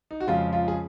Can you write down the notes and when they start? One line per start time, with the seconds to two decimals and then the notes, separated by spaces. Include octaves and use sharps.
0.11 D#4
0.20 F#4
0.27 F2 C#3 F3 G#3 F4
0.53 F4
0.68 G#4